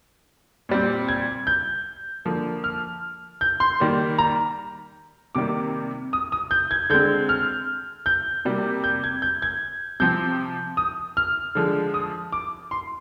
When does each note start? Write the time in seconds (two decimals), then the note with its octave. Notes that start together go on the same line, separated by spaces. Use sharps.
0.69 A#2 G3 C4
1.09 G#6
1.47 G6
2.25 D3 F3 A#3
2.64 F6
3.41 G6
3.60 C6
3.80 D#3 G3 A#3
4.18 A#5
5.35 C3 D#3 G3 A#3 D6
6.13 D#6
6.32 D#6
6.51 G6
6.71 G#6
6.90 D3 G#3 C4 G6
7.29 F6
8.06 G6
8.45 C3 G3 A#3
8.84 G6
9.04 G#6
9.22 G6
9.42 G#6
10.00 C3 F3 C4 G6
10.77 D#6
11.17 F6
11.55 D3 F3 G#3
11.94 D#6
12.32 D6
12.71 C6